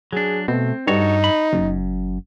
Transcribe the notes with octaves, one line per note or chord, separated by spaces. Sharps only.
F#3 D4 G#4
B2 A3 C4
G2 D#4 F#4 A4 C#5
B5
F#1 F#2